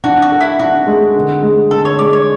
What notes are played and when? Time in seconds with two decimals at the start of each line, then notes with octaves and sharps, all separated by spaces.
0.04 D4 F#4
0.22 F#4
0.32 A4
0.40 E4
0.59 D4 F#4
0.87 G#3
1.16 D3
1.42 G#3
1.71 D3 A4
1.85 C#5
1.99 G#3 D5
2.13 C#5